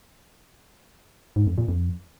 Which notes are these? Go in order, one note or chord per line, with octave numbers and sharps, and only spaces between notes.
G#2
F2
A#2
F2